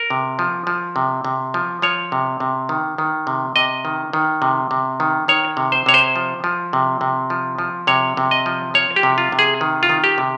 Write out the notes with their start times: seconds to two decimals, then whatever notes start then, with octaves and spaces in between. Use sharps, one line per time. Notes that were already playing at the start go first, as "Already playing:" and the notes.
Already playing: A#4
0.10 C3
0.39 F3
0.67 F3
0.96 C3
1.25 C3
1.54 F3
1.82 F3 C#5
2.12 C3
2.40 C3
2.69 D#3
2.98 D#3
3.27 C3
3.56 C3 D#5
3.85 D#3
4.13 D#3
4.42 C3
4.71 C3
5.00 D#3
5.28 D#3 C#5
5.57 C3
5.72 C5
5.86 C3 C#5
5.94 C5
6.16 F3
6.44 F3
6.73 C3
7.01 C3
7.30 F3
7.59 F3
7.87 C3 C#5
8.17 C3
8.31 D#5
8.46 F3
8.74 F3 C#5
8.96 G4
9.03 C3
9.18 F4
9.32 C3
9.39 G#4
9.61 D#3
9.83 F4
9.89 D#3
10.04 G4
10.18 C3